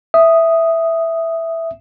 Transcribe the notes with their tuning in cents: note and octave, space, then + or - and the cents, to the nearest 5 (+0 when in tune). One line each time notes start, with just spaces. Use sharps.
E5 +0 D#6 +0